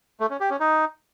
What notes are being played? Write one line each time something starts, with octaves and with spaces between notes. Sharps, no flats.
A3
C#4
G4
C#4
D#4